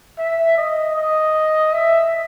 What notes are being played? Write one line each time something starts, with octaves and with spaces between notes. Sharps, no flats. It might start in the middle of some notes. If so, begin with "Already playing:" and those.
E5
D#5
D#5
E5